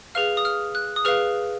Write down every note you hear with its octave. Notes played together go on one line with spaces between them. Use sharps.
G#4 B4 F5 F6
D#6
F6
F#6
D#6
G#4 B4 F5 F6